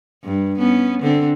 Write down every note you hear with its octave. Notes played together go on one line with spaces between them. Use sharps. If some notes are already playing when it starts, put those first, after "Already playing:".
G2
B3 C#4
D3 C4